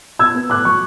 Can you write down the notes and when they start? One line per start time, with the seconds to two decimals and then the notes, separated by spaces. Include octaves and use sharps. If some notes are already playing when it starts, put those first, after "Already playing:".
0.19 B3 E6 G#6
0.35 B3
0.50 A2 D6 F#6
0.65 F#3 C#6